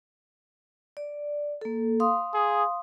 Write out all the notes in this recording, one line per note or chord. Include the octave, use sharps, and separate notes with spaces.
D5
A#3 A4
F5 C6 D#6
G#4